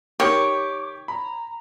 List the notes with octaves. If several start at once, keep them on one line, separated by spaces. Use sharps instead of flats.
D#3 G4 C#5 G5 D6
A#5 B5